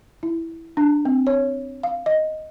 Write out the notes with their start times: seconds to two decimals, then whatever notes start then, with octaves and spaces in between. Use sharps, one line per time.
0.23 E4
0.77 D4
1.05 C4
1.27 C#5
1.83 F5
2.06 D#5